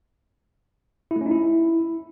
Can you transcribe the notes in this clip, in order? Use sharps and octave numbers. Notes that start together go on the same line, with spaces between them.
E4
A3
C#4
D#4
E4